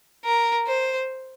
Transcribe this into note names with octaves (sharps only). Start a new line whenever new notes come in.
A#4
C5